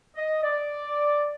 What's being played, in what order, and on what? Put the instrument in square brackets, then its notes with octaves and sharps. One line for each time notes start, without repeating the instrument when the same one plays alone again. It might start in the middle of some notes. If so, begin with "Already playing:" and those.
[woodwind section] D#5
D5